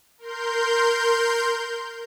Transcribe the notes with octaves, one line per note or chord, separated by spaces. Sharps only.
A#4 C6 G6